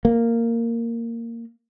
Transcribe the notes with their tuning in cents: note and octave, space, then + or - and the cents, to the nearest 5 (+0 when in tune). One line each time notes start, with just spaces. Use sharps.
A#3 -10